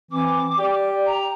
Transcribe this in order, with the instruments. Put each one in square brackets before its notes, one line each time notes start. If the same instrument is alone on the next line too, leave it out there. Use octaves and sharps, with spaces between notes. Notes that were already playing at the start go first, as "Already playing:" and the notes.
[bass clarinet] E3 [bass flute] C4 [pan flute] D6
[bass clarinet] G4 [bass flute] D5
[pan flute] A#5